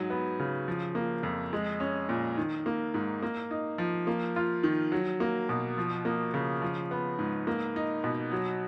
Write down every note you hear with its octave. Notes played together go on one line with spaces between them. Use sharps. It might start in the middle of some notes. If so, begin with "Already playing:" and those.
Already playing: G#2 F#3
B3
C#3
F3
A#3
F2
G#3
C#4
A#2
D#3
A#3
G#2
A#3
D#4
F3
A#3
F4
D#3
F#3
A#3
B2
F3
A#3
C#3
F3
B3
G#2
A#3
D#4
B2
F#3